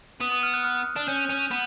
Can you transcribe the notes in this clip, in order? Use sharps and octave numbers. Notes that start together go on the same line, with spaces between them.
B3 D#6
D#6
F6
F#6
F6
D4
C#4 G6
C#4
B3